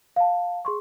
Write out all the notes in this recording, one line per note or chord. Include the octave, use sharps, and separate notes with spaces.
F5 A5
G#4 C6 C#6